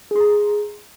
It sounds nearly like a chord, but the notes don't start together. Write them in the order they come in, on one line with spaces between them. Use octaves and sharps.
G#4 C6 A#5